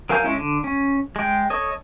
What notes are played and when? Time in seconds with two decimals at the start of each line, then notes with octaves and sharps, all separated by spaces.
0.09 F#3 A#4 F5 G#5 G6
0.23 G#3 C#4 E4
0.36 D3
0.64 C#4
1.16 G#3 G5
1.50 A4 C#5 D#5